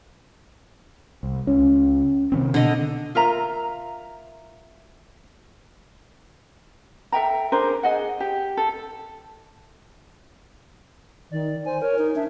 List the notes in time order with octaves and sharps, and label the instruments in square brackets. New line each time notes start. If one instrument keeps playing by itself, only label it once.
[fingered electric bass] C2
[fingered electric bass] C#2 [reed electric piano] C#4
[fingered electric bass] C3 D#3 C4
[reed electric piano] B2 [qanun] D3 D#5
[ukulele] F4 A#4 E5 A#5
A4 E5 G5 A#5
D4 G#4 A#4 C5
G#4 D#5 F#5
G4
A4
[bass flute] D#3 [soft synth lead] D5
[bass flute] C5 [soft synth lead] G#5
[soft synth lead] A#4 [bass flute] C#5
[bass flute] D#4
[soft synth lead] D4 [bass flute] E5